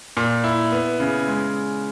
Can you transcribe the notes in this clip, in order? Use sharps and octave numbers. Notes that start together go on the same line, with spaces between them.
A#2
E4
B3
C#3
G#3